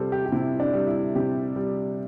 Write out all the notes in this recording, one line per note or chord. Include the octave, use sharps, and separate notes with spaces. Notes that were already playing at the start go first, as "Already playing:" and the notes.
Already playing: C3 G3 A4 C5 D5
G4
G4
C3 E4
D4
G3
E4
C3 G4
G3